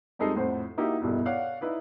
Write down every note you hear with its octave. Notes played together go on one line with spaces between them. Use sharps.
F2 G3 G#3 D#4 A4 C7
F2 A2 C5 F#5
A#3 D#4 E4 F#4 G4
E1 B1 G2 B2 E4
C#5 D5 F5 F#5 F#6
D#4 E4 B4 D5